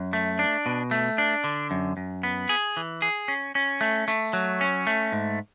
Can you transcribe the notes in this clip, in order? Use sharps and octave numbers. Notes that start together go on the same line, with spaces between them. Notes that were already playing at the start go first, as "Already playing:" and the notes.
Already playing: F#2
A3
D4
B2
A3
D4
D3
F#2
F#2
B3
G#4
E3
G#4
C#4
C#4
A3
A3
F#3
C#4
A3
G#2